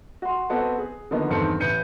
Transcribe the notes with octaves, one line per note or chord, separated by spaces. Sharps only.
F#4 C6
B3 C4 F#4 A4 B4 D#5
G#4
D3 D#3 F3 A#3 B3 D#4
E2 G2 D#3 C4 A4 C#7
A1 B4 G6 C#7 D#7